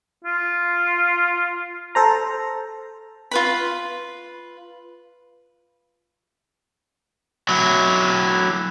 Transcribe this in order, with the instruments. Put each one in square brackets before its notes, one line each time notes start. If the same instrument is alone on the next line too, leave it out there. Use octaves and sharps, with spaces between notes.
[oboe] F4
[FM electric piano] A4 C5 A#5
[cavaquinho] F4 B4 B5
[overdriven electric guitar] F#3 E4